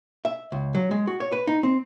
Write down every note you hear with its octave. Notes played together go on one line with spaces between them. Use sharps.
E5
C#2
F#3
G#3
F#4
C#5
B4
D#4
C4